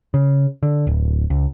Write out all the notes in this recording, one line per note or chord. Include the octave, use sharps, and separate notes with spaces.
C#3
D3
D1
C#2